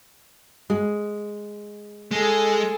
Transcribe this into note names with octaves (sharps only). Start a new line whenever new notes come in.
G#3
G#3 G#4 A4